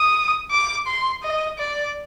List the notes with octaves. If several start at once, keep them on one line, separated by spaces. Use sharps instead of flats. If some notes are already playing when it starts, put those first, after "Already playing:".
Already playing: D#6
D6
C6
D#5
D5